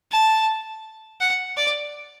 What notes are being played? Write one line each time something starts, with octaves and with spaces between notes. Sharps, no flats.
A5
F#5
D5